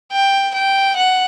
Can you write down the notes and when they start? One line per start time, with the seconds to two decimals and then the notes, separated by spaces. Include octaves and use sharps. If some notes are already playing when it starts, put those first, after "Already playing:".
0.12 G5
0.54 G5
0.96 F#5